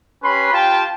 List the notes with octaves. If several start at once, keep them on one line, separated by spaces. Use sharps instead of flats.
C#4 G4 B4 B5 C6
F4 G4 G5 A5